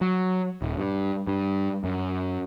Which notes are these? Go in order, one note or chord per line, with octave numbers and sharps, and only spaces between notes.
F#3
D#1
G2
G2
F#2